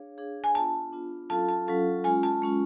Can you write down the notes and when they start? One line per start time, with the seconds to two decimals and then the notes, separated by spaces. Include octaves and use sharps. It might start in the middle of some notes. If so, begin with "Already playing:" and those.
Already playing: D4 G#4 C#5 F5
0.17 D4 G#4 C#5 F5
0.44 G#5
0.55 B3 D4 F4 A5
0.93 B3 D4 F4
1.30 F#3 C#4 F4 A4 F5 A5
1.49 A5
1.67 F#3 C#4 F4 A4 F5
2.04 G#3 C#4 F4 G#5
2.23 A5
2.42 G#3 C#4 F4